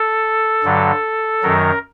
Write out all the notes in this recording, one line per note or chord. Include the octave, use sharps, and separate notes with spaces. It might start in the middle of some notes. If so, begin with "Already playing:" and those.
Already playing: A4
G2 D3 F#3
F#2 D#3 F#3 A#4